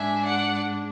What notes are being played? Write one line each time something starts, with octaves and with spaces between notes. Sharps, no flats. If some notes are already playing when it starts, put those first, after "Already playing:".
Already playing: G#2 G#3 D4 E5 G#5
D5 F#5